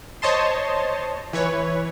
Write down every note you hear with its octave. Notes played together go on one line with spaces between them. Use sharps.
C5 C#5 D#5 A5 C6
E3 B4 C#5